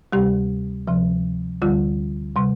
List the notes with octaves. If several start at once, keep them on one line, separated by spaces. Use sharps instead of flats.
D2 C3 G3 G4
D2 C3 F3
D2 D3 G3 F4
C3 G3